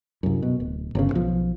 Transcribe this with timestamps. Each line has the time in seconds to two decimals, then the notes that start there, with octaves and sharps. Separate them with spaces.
0.23 C2 F#2
0.42 B2
0.60 D1
0.95 G1 C#3
1.12 B1 F3